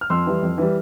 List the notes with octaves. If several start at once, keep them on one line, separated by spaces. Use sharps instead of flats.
F6
F2 C6 E6
E3 G3
F2
E3 G3